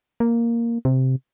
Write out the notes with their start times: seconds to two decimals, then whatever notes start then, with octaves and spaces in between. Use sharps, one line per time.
0.20 A#3
0.85 C3